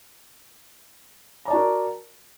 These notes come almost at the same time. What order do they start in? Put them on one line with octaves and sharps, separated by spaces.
A#5 D5 A5 F#4 A#4